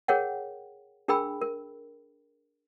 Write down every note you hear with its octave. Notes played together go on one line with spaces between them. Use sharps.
G#4 A#4 C#5 F#5 G5
D4 G#4 A#4 G5 B5 E6
A#4